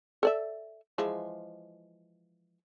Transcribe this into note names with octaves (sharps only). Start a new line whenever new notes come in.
A4 D5 E5
E3 F3 G#3